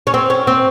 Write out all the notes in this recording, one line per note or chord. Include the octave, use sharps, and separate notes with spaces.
C#4
C4
C#4
C4